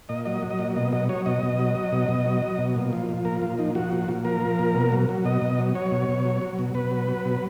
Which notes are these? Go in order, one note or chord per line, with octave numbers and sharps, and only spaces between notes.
A#2 D#5
F#3 D#5
F#3
D#5
A#2
B2 D#5
F#3 D#5
F#3 C#5
B2 D#5
B2
F#3
F#3
B2
B2
F#3
F#3
B2
A#2
F3
F3
A#2 A#4
A#2 F4
F3 D#4
F3 F#4
A#2
A#2
F3 A#4
F3
A#2
B2
F#3
F#3
B2 D#5
B2
F#3
F#3 C#5
B2
B2
F#3
F#3
B2
B2 B4
F#3
F#3
B2